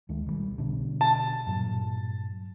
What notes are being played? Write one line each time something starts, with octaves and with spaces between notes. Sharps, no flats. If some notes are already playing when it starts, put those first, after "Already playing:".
D2 D#3 G#3
B1 E3 G3
B2 D3
A5
G2 A#2 F#3